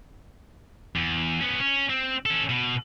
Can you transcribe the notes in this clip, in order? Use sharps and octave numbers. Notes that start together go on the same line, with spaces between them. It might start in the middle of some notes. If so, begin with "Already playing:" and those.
E2
B3 C#4
C#4
C4
C#4 A4
B2